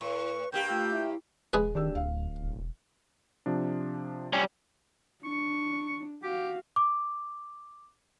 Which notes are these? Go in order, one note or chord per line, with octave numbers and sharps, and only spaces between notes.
A2 B4 C#6
G2 A#3 G4 G5 G6
A3 F4 G5 E6
E4 E5
D#1 G#3 G#4 B4
D1 D#3 D4 G4 E6
D2 F5
E1
C3 F3 D4
G3 C#4
D4 C#6
F#4 G4 F5
D6